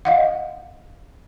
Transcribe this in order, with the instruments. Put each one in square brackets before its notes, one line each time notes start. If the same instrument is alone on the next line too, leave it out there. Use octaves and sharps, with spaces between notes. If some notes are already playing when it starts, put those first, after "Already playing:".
[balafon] D#5 F5 F#5